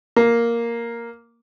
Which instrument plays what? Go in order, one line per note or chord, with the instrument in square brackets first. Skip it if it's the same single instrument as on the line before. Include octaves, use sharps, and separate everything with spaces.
[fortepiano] A#3